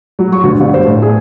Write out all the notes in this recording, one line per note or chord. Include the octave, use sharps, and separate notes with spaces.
F#3
C#6
D2
G1
C5
A2
G#4